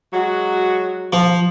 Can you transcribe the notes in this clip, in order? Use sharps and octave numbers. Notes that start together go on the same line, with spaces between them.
F#3 G#3 F#4
F3